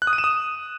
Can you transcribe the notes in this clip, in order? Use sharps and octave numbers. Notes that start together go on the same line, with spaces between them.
F#6
D#6
D#7
E7
D#6